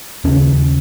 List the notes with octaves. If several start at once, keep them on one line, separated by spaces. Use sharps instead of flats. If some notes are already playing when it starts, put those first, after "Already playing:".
D#2 C#3 C#4